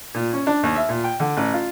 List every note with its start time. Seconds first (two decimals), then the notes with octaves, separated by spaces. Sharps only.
0.14 A#2
0.33 C#4
0.47 D4
0.63 D#2
0.76 E5
0.89 A#2
1.04 G5
1.20 D3
1.37 A1
1.53 F4